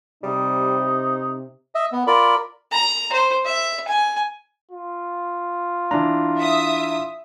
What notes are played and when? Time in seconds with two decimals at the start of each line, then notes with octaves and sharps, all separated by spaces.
0.23 C3 G3 D#4
1.75 D#5 E5
1.92 B3
2.07 F4 A#4 D5 B5
2.72 A#5
3.12 C5
3.45 E5
3.88 G#5
4.71 F4
5.91 E3 D4 A#5
6.38 E5 D#6